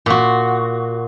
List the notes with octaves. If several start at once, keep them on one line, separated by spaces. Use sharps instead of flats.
A#2 F#4